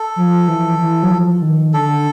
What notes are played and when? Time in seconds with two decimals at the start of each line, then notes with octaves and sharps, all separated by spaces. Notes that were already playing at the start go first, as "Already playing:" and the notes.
Already playing: A4
0.16 F3
0.48 E3
0.79 E3
1.03 F#3
1.11 F3
1.42 D#3
1.74 D3 A4